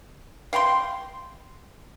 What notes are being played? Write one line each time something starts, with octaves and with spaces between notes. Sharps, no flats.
F5 G5 A#5 C6